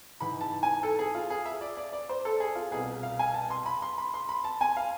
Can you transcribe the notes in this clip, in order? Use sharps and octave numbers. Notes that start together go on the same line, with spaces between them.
G#2 E3 B5
A5
G#5
A4
G#4
F4
G#4
E5
D5
D5
D5
C5
A4
G#4
F4
C2 B2 G#4
F5
G#5
A5
C6
B5
C6
B5
C6
B5
A5
G#5
F5